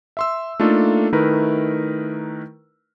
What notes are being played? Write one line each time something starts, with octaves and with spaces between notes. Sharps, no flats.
E5 C6 E6
A3 A#3 D4 D#4 F4 A4
D#3 A3 D#4 E4 A#4 B4